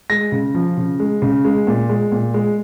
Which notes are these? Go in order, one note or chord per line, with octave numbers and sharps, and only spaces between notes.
G#3 A#6
C#3
F3
C#3
G#3
C#3
G#3
A#2
G#3
A#2
G#3